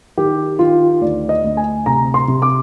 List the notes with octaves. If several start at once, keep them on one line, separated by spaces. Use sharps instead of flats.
D#3 G4
D#3 F4
D2 D5
D#5
D2
G#5
C3 A#5
C6
C3
D6